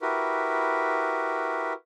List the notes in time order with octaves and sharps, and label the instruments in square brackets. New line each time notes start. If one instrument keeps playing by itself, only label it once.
[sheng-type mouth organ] E4 F#4 G4 A#4 B4